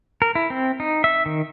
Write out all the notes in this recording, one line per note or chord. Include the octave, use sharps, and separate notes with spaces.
A#4
E4
C4
D#4
E5
D#3